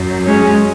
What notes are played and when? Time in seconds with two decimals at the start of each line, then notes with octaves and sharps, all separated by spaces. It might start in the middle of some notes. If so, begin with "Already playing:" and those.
Already playing: F#2
0.26 G#3 C#4